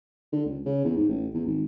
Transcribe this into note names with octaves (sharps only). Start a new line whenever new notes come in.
D3
C#2
C#3
E2
G#2
A1
E2
G#1